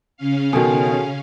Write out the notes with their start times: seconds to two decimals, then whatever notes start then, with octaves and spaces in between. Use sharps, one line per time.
0.17 C#3 C#4 F5
0.53 B2 D#3 F#4 A4 G#5